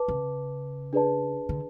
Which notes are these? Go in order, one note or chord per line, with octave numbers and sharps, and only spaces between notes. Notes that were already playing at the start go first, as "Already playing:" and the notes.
Already playing: B4 A5 D6
C#3
D4 G#4 B4 D5 A5
D3